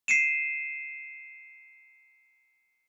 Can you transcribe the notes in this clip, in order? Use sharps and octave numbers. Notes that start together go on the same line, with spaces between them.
C7 C#7 D#7 E7